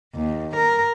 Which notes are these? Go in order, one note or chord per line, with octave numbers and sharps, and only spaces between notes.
D#2
A#4